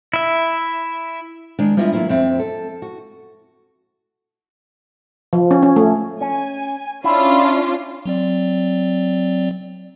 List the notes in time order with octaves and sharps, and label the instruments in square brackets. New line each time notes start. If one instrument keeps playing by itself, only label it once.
[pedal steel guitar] E4 E5
[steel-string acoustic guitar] D#3 G#3 D4
G3 B3 E4 F4 D#5 E5
E3 F#3 A#3 E4 F4
F2 C4 E5
A4
F#4
[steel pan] F3
C#4
C#4
A3
[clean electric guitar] C#4 [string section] G#5
[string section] C#4 D4 F4 [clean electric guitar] E4
[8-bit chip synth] F#3 C4 D5